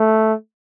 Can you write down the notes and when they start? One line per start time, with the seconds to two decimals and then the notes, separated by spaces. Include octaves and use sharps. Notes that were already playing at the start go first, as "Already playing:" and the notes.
Already playing: A3